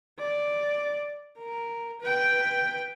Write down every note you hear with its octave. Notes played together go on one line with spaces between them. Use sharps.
D5
A#4
B4 G5